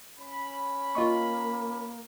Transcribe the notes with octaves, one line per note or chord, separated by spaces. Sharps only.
C#4 B5
A#3 F4 D#5 C#6